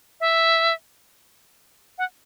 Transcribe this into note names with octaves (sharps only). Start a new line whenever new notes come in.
E5
F#5